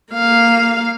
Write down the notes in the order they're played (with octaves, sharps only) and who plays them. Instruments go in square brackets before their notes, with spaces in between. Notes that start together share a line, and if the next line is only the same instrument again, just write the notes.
[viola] A#3 F5